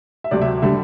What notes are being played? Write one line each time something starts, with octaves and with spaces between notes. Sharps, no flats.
E5
D2 C3 F#3 A3 D5
E5
D3 G3 E5